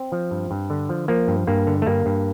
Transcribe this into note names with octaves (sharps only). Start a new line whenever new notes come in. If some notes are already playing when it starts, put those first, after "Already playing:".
Already playing: C4
F3
G2
G2
D3
F3
F3 A#3
G2
G2 A#3
D3
A3
G2 A#3
G2